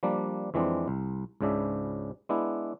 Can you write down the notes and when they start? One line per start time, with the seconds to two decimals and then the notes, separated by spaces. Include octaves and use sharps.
0.03 F3 G3 A#3 D4
0.54 F2 E3 G#3 C4 D4
0.88 C2
1.41 C#2 G#2 C#3 D4 E5
2.29 G#3 B3 D4 E4